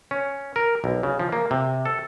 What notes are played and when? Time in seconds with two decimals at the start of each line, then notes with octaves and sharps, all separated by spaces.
0.11 C#4
0.56 A#4
0.84 B1
1.03 C#3
1.20 F3
1.32 A#3
1.51 C3
1.85 A4